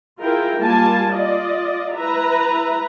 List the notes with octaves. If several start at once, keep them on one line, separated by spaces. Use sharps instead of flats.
E4 F4 G#4 A#4 G5
G3 A#3 F4 G#5 A5
F4 D5 D#5
E4 B4 E5 A#5